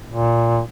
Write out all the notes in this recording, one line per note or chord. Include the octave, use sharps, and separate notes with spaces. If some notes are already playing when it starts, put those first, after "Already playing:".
A#2